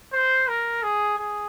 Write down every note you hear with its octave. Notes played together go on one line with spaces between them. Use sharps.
C5
A#4
G#4
G#4